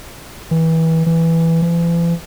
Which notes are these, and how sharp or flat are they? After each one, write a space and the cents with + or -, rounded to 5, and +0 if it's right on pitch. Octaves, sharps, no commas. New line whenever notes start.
E3 -25
E3 +0
E3 +45